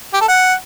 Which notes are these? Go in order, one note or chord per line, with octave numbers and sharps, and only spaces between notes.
G4
A4
F#5